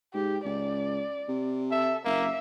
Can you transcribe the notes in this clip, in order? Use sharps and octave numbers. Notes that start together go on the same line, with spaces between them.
G#2 G4
C#2 D5
C3
A4 E5
F#1 A#3 E5